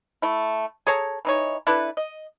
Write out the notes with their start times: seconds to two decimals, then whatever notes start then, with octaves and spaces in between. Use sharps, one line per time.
0.22 A3 E4
0.87 G#4 A4 C#5 A#5
1.25 E3 D#4 C#5
1.67 D4 E4 A4 B4
1.97 D#5